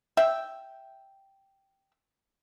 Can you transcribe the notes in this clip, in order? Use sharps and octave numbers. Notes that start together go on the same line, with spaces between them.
E5 G5